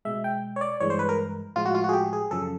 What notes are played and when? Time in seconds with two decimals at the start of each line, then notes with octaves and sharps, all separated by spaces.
0.05 B2 G#3 E5
0.24 G5
0.56 C#5
0.61 D5
0.80 G2 E3 G#3 C#5
0.90 C5
0.99 B4
1.09 A#4
1.56 A2 F3 G#3 F4
1.65 F#4
1.75 F4
1.84 F#4
1.89 G#4
1.93 G4
2.13 G#4
2.31 F#2 C#3 F3 A4